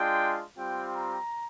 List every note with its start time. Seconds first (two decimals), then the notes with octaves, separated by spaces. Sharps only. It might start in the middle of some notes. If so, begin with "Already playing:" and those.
Already playing: G#3 D4 F4 G5
0.57 G3 C4 F4 G5
0.94 A#5